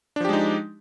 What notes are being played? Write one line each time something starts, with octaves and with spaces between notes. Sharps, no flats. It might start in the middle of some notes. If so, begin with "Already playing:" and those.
F3 G#3 D4 D#4 G4